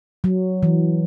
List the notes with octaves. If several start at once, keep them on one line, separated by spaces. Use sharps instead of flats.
F#3
E3